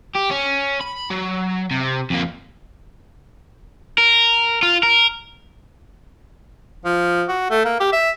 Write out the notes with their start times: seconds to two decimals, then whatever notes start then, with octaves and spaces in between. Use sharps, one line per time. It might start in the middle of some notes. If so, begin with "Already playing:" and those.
0.15 G4
0.31 C#4
0.81 B5
1.11 F#3
1.71 C3
2.10 F2 A#3
3.98 A#4
4.63 F4
4.83 A#4
6.85 F3
7.28 F#4
7.50 A3
7.65 A#3
7.80 G4
7.93 E5